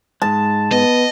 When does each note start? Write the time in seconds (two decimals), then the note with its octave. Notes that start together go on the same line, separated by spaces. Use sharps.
0.22 G#2 G#3 A5
0.72 B3 D#5